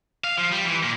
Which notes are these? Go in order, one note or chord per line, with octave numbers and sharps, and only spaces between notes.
F5
F3
G3
E3
A#2